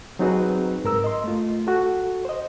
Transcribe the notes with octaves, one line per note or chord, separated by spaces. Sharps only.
F#3 C4 D#4 F#4 G#4 B4
G#2 A#4 E6
D#5 C6
A3 F4
F#4 A4
C5 D#5